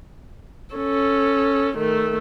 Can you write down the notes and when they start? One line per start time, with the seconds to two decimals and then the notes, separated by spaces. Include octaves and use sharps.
0.75 C#4 A4
1.77 D#3 A3